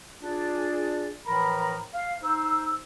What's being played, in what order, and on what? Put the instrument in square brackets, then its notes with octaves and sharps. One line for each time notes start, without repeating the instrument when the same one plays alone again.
[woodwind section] D4 F4 G#4 D5
A2 E3 F3 A#4 A#5 B5
F5
D#4 C5 E6